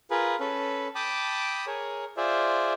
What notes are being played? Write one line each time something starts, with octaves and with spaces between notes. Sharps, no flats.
F4 G#4 A#4 B4
C#4 A4 B4
G5 A5 B5 D6 D#6
G#4 A#4 C#5
F4 G#4 C5 D5 E5